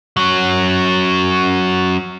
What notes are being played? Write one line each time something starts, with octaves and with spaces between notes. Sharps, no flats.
F#3 C#4